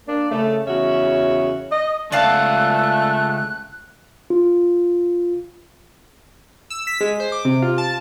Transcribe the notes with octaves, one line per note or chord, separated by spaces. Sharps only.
A#3 D4
C#3 A3
E2 C#3 C#4 F#4 E5
D#5
C#2 A3 D5 F5 F#5 A5 F#6
F4
E6
B6
G#3
C5
D6
C3
F4
A5